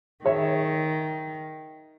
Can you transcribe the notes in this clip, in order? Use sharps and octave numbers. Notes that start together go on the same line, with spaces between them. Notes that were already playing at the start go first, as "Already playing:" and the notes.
D#3 G#4 C#5 E5